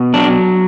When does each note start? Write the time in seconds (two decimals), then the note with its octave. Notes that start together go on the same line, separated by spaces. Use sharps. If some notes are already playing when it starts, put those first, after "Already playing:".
Already playing: B2
0.14 F#3 D4